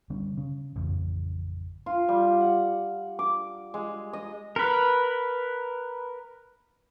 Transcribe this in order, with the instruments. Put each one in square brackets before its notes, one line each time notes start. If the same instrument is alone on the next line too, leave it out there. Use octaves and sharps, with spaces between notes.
[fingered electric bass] D3 G3 B3 C#4
C#3 C#4
A1 F2 C#3
[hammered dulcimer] F4
G3
F#5
D6
G#3
D#5
[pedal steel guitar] A#4 B4